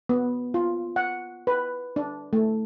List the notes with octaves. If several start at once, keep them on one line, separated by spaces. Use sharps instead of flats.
B3
F4
F#5
B4
D4
A3